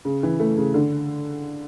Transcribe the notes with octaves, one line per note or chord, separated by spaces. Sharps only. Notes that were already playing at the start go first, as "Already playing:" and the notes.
C#3
E3
A3
C#3
D3